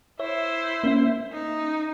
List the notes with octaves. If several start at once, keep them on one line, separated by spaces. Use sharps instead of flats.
E4 C5 C#5 E5
A#3 C#4 E5
D#4